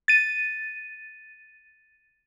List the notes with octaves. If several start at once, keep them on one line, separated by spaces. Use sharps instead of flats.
A6 D#7